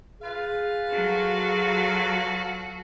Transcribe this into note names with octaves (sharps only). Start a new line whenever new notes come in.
F4 G#4 B4 F5
F#3 F#4 A4